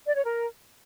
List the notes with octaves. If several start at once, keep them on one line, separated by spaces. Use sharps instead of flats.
D5
C#5
A#4